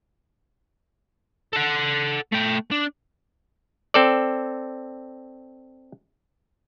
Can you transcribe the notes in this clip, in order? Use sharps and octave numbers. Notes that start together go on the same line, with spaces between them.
A4 F#5
A3 G5
D4
C4 A4 D5